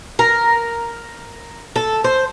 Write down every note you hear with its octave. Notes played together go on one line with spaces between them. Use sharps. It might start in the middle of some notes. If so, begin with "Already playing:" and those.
A#4
A4
C5